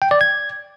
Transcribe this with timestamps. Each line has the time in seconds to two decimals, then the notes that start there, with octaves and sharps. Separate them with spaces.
0.02 G5
0.11 D5
0.21 G#6